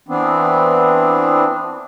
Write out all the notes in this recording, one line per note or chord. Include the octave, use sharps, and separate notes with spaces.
E3 B3 C4 D4